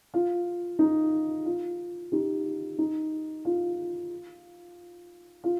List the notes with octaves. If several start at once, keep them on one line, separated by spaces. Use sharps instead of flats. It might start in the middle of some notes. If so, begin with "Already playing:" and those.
F4
D#4
F4
D#4 G4
D#4
F4
F4